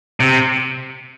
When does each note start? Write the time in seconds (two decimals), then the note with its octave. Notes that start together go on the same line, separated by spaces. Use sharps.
0.20 C3